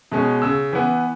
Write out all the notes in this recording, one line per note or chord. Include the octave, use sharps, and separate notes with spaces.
B2 G#3 C#4
C#3 E6
E3 B3